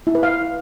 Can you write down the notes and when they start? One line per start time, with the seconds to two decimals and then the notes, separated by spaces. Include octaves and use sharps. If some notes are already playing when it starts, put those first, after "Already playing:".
0.07 E4
0.15 B4
0.23 F5